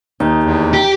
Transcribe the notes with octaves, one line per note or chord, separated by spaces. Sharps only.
D#2 D#4
E2
G4